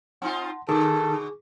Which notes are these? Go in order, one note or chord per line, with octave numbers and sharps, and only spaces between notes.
C4 D#4 F4 F#5 A5 C6
B2 D3 D#3 G#4 A4 D6